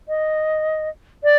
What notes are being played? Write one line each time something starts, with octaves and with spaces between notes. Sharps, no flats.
D#5
D5